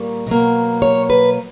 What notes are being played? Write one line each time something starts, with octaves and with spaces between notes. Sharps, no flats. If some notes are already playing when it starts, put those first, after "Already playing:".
Already playing: A#2 G3 A#3 C#5
B2 F#3 A#3
C#5
B4